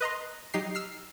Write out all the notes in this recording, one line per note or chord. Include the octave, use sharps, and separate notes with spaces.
B4 D#5 A#5 C6
F#3 D#4 G4 C7
E6 F6 C7